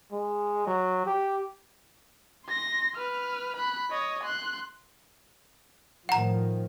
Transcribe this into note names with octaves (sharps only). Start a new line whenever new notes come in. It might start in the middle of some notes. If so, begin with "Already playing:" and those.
G#3
F#3
G4
C6 A#6
B4 F6
B5 F#6
C#5 D#5
C6 F#6
A2 D#3 F3 F#5 A#5